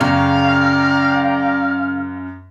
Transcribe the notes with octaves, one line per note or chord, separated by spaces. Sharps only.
F#2 C#3 D5 F5 G5 A#5